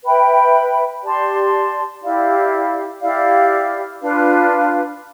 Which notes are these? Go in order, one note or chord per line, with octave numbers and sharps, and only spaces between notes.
B4 E5 G5 B5
G4 D5 A5 C6
E4 G4 D5 F5
E4 G4 D5 F5
D4 F4 B4 F5